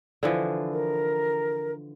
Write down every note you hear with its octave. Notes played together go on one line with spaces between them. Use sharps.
D3 E3 F3
A#4